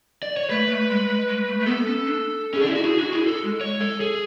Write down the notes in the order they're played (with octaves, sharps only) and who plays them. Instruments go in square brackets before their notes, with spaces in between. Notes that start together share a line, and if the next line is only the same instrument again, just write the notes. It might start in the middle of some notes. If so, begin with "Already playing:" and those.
[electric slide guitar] D5
C#5
[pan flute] A3 [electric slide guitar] B4
[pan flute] A3
G#3
G#3
G#3
A3
A3
[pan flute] B3 [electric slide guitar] A4
[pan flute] C#4
D4
[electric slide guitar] C#4 [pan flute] G#4
[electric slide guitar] D4
E4
F#4
[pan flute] E4 [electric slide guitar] G#4
[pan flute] D4 [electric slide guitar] F#4
[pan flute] E4 [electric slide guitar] G#4
[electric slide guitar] A4
[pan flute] G#3
[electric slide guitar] C#5
A4
G#4